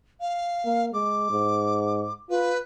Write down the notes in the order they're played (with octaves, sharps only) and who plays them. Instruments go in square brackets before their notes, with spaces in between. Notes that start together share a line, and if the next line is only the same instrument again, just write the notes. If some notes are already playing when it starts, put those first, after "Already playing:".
[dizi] F5
[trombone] A#3
[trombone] G#3 [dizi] D6
[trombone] G#2
[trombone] F4 [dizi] B4